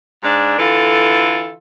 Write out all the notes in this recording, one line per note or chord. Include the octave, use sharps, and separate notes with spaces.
G#2 D4
D3 E3 F4 A4